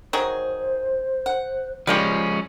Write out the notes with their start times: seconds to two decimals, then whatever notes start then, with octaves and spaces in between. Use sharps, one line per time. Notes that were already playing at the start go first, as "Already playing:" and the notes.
0.13 D#3 F#3 G#4 C5
1.26 F#5
1.87 F3 G3 G#3 C#4 F4 G4